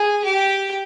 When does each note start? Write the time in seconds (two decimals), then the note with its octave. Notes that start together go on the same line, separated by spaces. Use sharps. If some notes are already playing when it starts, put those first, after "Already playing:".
Already playing: G#4
0.24 G4